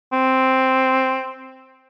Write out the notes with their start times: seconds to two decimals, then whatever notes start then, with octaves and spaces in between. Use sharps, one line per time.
0.13 C4